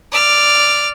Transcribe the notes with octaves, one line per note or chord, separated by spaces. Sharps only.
D5 F6